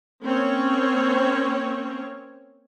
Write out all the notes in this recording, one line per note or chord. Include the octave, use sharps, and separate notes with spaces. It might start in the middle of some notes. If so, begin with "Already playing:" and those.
A#3 C4 C#4 C#5